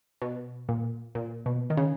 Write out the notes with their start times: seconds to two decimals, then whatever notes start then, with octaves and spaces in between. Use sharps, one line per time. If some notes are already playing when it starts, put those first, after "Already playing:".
0.22 B2
0.69 A#2
1.15 A#2
1.46 B2
1.70 D#3
1.77 C#3